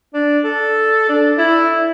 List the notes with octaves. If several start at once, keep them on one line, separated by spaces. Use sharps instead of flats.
D4
A4
D4
E4